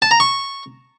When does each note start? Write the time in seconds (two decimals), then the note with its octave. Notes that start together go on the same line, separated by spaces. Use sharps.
0.02 A5
0.11 A#5
0.20 C#6